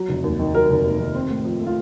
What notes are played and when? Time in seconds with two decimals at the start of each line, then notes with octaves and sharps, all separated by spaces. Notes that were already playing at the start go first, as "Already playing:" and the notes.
Already playing: F#3
0.09 F1
0.24 D#2
0.39 D#3
0.54 F#3 A#4
0.70 F1
0.84 D#2
1.00 D#3
1.15 C4
1.30 A2
1.44 F3
1.60 A3
1.67 F4